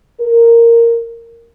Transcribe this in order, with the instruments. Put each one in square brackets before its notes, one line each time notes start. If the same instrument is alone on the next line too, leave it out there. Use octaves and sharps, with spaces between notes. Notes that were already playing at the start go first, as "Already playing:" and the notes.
[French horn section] A#4